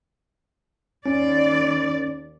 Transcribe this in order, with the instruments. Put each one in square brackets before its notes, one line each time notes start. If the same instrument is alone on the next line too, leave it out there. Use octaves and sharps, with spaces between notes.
[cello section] D#2 D5 [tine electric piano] C#4